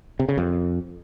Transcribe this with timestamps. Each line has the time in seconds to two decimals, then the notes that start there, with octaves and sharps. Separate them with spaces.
0.20 C3
0.29 C#3
0.38 F2